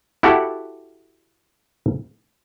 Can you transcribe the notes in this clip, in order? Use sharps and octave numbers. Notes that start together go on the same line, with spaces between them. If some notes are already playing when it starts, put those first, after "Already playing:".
E4 F#4 G4 A4 F#5